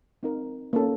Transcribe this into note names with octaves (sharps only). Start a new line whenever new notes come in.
C4 D#4 A#4
A#3 C#4 A4